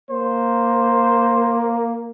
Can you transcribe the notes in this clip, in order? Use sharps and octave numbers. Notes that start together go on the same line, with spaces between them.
A#3 C5